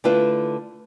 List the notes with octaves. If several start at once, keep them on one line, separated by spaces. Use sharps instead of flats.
D3 A3 E4 F4 B4